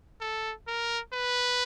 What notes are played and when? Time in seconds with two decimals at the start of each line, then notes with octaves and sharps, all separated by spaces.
0.21 A4
0.67 A#4
1.14 B4